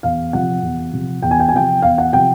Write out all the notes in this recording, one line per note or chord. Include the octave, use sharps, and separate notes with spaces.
E2 F5
C3 F3 F#5
E2
C3 F3
E2 G5
G#5
G5
G#5
C3 F3 G5
E2 F5
F#5
C3 F3 G5